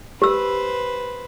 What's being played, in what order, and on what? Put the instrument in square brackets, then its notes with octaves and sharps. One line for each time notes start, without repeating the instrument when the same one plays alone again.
[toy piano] G4 E6 [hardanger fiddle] B4 C5